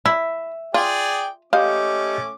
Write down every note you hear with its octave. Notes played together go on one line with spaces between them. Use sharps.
E4 E5
F4 G#4 D5 G5
A3 C#4 G4 D#5 F5 D6 G6